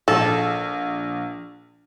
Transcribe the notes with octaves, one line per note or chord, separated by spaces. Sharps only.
A#1 A4